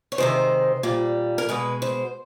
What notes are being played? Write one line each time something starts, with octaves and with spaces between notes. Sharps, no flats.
C#5
C3 D#3 G#3 C5
A#2 G3
A#4
B2 G#3 B4
C5